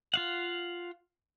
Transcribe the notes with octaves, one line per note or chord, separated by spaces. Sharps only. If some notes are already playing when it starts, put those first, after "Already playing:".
F4 F5 F#5